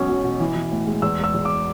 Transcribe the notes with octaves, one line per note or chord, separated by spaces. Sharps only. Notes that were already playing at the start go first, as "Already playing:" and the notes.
Already playing: E1 B1 C#4
F#3
B2
E3
E3
A2
G#3
E2 E6
G#3 E6
E2
D6